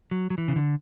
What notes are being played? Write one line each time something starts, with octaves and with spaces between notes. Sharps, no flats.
F#3
F#3
E3
C#3
D3